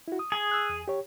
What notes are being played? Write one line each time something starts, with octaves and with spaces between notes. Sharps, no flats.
E4 F#4
D#6
G#4
E6 F#6
E2
G4 C#5